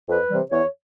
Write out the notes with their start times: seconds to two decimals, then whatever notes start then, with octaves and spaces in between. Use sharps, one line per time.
0.08 F2 B4
0.30 C3 E3 G3
0.50 E2 C#5